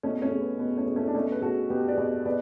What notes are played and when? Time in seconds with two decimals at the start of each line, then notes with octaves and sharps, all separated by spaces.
0.03 B2 A3 C#4
0.22 A3 C#4
0.31 B2
0.41 B3
0.59 B2 B3
0.78 A3 C#4
0.87 B2
0.96 A3 C#4
1.08 D4
1.14 B2 A3 C#4
1.31 B4
1.42 B2 F#4 A4
1.70 B2 G4 B4
1.88 B4 D5
1.97 B2
2.25 B2 B4 D5